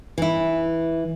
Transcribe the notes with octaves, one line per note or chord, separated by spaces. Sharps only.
E3 E4